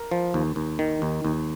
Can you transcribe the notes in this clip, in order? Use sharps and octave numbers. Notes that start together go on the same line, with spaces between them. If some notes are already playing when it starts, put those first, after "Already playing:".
Already playing: A#4
F3
D#2
D#2
D#3
D#2
D#2